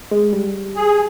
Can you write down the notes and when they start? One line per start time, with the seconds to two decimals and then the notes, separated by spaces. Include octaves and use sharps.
0.11 G#3
0.33 G3
0.76 G#4